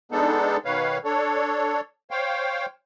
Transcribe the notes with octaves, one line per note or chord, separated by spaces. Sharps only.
G#3 B3 D4 D#4 A4
B2 D#3 B4 C#5 F5
D4 A4 C#5
C5 C#5 F5 G5